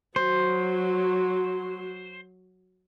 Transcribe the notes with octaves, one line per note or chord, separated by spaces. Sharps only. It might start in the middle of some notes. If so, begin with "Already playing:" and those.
F#3 C5